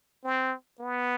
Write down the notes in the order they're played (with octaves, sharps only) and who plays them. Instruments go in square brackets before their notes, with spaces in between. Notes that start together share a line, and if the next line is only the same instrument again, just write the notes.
[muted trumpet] C4
B3